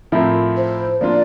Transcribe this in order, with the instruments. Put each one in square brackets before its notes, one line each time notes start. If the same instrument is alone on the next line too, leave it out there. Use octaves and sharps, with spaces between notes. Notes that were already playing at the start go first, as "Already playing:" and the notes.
[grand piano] A2 F3 C4 E4 A#4
[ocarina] C5
[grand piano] F3 A#3 D4 F4 [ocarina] D5